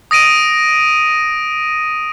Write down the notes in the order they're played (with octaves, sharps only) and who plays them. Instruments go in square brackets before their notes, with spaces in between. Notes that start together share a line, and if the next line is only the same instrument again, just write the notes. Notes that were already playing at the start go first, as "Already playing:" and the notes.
[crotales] D#6 A#6 D7 D#7